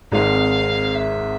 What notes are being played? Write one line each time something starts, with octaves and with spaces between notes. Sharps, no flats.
G#1 G#2 G#3 C4 F5
E5